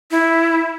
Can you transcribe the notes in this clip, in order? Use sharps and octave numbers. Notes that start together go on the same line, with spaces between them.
E4